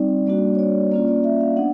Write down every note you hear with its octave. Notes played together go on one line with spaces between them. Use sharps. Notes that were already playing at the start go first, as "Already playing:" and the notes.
Already playing: G3 C4 D#4 D5
G3 A#3 D4 F#4 D5
C#5
D5
A#3 C#4 F4 D5
D5
E5
F5
B3 D4 F#5